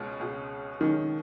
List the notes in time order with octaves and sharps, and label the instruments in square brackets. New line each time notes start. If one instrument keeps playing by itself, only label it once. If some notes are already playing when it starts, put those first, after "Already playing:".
Already playing: [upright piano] C#2 B2 G#3 C#4 F4
C#2 B2 G#3 C#4 F4
[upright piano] C#2 B2 G#3 C#4 F4 [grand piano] D#3